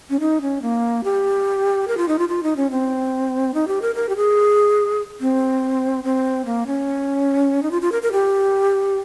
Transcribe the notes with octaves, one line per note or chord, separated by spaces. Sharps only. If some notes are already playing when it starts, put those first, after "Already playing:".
C#4
D#4
C#4
A#3
G4
A#4
F4
D#4
F4
F4
D#4
C#4
C4
D#4
G4
A#4
A#4
G4
G#4
C4
C4
A#3
C#4
D#4
F4
F4
A#4
A#4
G4